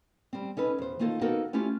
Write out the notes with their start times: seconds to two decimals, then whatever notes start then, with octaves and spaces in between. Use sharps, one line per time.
0.33 G3 C4
0.57 C#4 D#4 A4 B4
0.78 E2 C5
0.99 D#3 A#3 D#4 F4 G4 A4
1.21 A#3 B3 D#4 F#4 A4 A#4
1.53 A3 C#4 E4 F4 G4